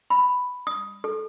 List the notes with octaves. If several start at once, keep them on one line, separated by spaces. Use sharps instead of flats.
B5
D#6
A4